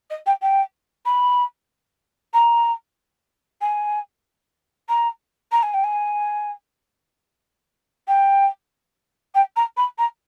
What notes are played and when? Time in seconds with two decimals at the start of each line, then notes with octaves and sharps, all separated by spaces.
0.10 D#5
0.26 G5
0.42 G5
1.05 B5
2.34 A#5
3.61 G#5
4.89 A#5
5.52 A#5
5.63 G#5
5.74 G5
5.84 G#5
8.08 G5
9.35 G5
9.56 A#5
9.77 B5
9.98 A#5